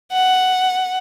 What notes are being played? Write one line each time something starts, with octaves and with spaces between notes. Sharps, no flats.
F#5